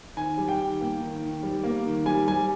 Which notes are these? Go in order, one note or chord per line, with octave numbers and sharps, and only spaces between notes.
D#3 G#5
G3
G5
D#3
A#3
D#3
D#3
G3
A#3
D#3
G3 G#5
G3 G#5